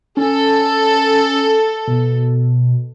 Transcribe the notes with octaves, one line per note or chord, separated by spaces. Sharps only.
C#4 A4
B2